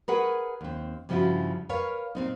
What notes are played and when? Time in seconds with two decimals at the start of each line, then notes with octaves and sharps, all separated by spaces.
0.08 G#4 A#4 B4 C#5 F#5
0.61 D#2 C4
1.09 G2 C#3 F3 C#4 E4 F#4
1.69 A#4 B4 C#5 F5
2.15 A#2 C4 D#4